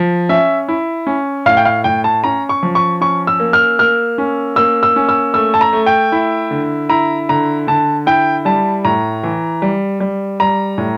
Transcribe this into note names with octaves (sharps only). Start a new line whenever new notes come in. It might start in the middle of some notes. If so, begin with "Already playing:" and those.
Already playing: F3
C#4 E5
E4
C#4
A2 F5
G5
F5
A2 G5
A5
C#4 A#5
C#6
F3
C#6
C#4 C#6
E6
A#3
F6
A#3 F6
C#4
A#3 E6
E6
C#4
E6
A3 E6
A5
A#5
A3
G5
E4
D3
E4 A#5
D3 A#5
D3 A5
E4 G5
G3 A5
A2 A#5
E3
G3
G3
G3 A#5
A2